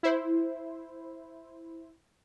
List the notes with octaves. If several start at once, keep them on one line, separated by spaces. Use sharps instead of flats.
E4 C5